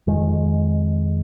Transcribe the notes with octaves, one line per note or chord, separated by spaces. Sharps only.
F2 D#3 G#3